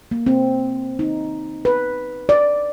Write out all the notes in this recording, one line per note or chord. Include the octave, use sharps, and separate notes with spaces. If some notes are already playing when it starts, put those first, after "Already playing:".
A#3
C4
D#4
B4
D5